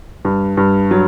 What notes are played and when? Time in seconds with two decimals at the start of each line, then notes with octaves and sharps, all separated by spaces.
0.25 G2
0.57 G2
0.91 F#3